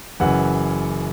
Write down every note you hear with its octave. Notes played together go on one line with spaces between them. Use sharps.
F#1 F#2 E3 F#5